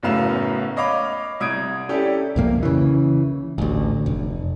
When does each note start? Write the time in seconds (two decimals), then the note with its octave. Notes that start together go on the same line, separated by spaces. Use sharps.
0.03 F#1 F#2 A2 B3 F5 E7
0.76 C#5 D#5 F5 B5 D6
1.40 C2 D#6 G#6 D7
1.89 C#4 E4 G4 A4 D5
2.36 C2 F2 A#3
2.63 C#3 E3
3.58 A1 D2
4.06 F1